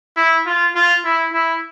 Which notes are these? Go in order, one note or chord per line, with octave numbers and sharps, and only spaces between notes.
E4
F4
F4
E4
E4